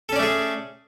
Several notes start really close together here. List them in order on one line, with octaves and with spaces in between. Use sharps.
A4 C#4 D5 A3 G#4